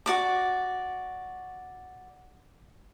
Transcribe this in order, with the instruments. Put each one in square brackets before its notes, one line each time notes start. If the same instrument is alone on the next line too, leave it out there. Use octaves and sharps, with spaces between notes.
[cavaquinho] F#4 D5 D6